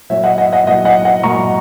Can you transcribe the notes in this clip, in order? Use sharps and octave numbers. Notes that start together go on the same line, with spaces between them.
A#2 F#3 C#5 E5
D#5 F#5
D#5 F#5
D#5 F#5
A#2 F#3 D#5 F#5
D#5 F#5
D#5 F#5
A#2 F#3 A#5 C#6